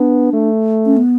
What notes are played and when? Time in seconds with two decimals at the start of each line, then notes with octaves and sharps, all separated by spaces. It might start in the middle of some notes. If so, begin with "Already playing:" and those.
Already playing: B3 D4
0.33 A3
0.86 C#4
0.97 B3